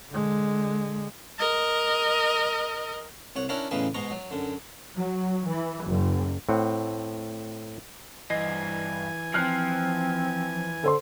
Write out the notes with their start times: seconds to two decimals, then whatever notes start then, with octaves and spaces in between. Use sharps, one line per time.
0.10 D3 G#3
1.39 A#4 D#5
3.36 C2 C#5 F#5
3.49 C#4 D4 E4 A#4 C#5 F#5
3.71 A1 E2 C#3 E3 D#4 B4
3.94 G#2 B2 D#4 A#5 C#6
4.11 F#3
4.31 F#2 D3
4.93 F#3
5.45 E3
5.84 F#1
6.49 A2 C4 F#5
8.30 G2 E3 D#5 G#5 C7
9.34 F3 C4 F6 F#6 C7
10.84 D3 A4 C5 C6